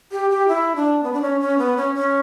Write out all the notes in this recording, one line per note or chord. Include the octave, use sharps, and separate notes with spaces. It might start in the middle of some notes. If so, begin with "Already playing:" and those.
G4
G4
E4
D4
B3
D4
C#4
C#4
B3
C#4
C#4